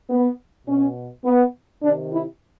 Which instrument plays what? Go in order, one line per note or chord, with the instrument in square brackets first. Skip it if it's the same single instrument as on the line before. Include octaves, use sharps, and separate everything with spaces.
[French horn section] B3
B2 C#4
B3
C3 D#3 D4
E4